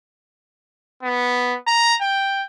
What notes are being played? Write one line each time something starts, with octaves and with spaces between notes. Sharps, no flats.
B3
A#5
G5